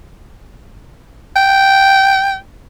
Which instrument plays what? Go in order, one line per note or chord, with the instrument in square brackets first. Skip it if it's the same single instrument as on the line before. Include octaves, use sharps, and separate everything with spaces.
[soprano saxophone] G5